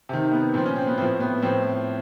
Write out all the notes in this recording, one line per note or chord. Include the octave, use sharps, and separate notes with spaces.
C3 D#3
B3
A#2 F3 C4
C#4
C4
B3
A2 F3 C4
B3
A2 F3 C4